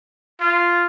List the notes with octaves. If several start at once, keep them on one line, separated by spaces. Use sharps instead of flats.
F4